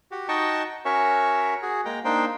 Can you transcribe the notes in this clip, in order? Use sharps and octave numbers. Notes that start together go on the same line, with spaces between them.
F#4 G4
D#4 F#4 D#5 G5 A5 C#6
C#4 F#4 A#4 C#5 E5 C#6
F#4 G#4
G#3 A#3 G5 A#5
A#3 D4 D#4 C5 G5